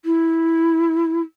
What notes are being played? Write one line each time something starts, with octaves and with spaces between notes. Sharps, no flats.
E4